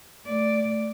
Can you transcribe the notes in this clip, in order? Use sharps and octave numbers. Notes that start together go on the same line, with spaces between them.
A3 D5